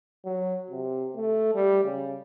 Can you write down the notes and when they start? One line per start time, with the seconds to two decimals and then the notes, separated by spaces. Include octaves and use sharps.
0.25 F#3
0.71 C3
1.15 A3
1.55 G3
1.84 C#3